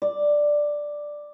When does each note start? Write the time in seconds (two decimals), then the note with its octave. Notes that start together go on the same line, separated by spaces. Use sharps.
0.02 D5